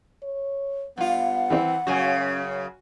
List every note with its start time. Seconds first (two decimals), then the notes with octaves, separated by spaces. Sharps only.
0.23 C#5
0.98 G2 B3 F4 F#5
1.50 E3 C4
1.87 F#2 C#3 C#4 F#4 G#5